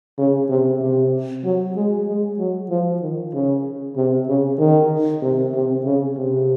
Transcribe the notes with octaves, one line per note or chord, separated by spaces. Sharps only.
C#3
C3
C3
F#3
G#3
G#3
F#3
F3
D#3
C#3
C3
C#3
D#3
C3
C3
C#3
C3